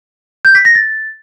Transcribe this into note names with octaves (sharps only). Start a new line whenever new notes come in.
G6
B6
A#6
A6